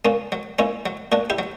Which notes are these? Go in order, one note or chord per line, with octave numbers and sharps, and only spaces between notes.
A#2 A#3 C#4
F#3
A#2 C#4 E4
F#3
A#2 D4 F#4
E4 G4
F#3